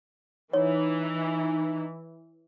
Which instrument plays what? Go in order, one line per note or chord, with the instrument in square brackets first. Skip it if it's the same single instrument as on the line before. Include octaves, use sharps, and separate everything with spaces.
[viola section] E3 [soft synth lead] D#4 [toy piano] C#5